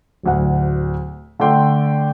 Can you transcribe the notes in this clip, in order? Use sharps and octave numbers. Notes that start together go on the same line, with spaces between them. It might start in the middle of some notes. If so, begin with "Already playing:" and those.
D1 D2 F#5
D3 A3 D5 G5 C6